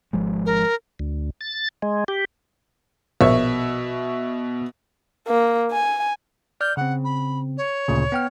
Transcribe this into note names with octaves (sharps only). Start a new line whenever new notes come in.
G#1 F3 G#3
A#4
D2
A6
G#3
G4
A#1 B2 E5 C#6
A#3
G#5
D5 F6 G6
C#3 C4 F#5
B5
C#5
D2 A#2 C#3
B3 G5 F6